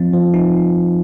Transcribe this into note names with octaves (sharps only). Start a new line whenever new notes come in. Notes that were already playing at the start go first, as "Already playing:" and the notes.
Already playing: F3 C4
F3
D#4